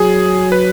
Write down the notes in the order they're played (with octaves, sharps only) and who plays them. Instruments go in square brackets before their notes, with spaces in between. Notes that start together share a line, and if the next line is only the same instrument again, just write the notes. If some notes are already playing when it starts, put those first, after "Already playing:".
Already playing: [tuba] F#3 [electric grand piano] G#4
[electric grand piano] B4